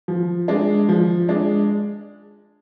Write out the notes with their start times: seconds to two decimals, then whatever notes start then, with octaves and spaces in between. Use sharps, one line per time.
0.08 F3
0.48 G#3 D4
0.89 F3
1.29 G#3 D4